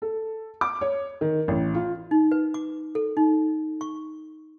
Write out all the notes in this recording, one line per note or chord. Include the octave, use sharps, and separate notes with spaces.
A4
D6
C#5
D#3
A1
F4
D#4
B4
D6
A4
D#4
C#6